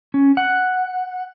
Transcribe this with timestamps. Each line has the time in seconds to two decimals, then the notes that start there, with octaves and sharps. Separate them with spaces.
0.14 C#4
0.37 F#5